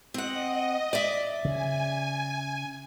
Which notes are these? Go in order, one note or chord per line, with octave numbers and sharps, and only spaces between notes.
C4 D#5 F#5
D5 E5
C#3 G#5